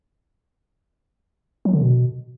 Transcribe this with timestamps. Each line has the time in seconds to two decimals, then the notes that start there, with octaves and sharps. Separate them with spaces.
1.65 F#3
1.73 D3
1.82 B2